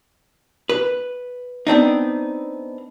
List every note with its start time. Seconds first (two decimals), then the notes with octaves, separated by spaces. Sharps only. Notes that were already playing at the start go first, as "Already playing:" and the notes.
0.69 B4
1.67 B3 C4 D4 D#4